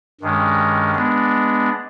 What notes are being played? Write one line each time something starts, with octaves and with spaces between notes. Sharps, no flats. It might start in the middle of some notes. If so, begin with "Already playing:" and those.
G2 D#3 G#3 C#4
G#3 B3 D4